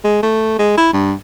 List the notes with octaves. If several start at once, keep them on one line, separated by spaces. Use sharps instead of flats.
G#3
A3
G#3
E4
G2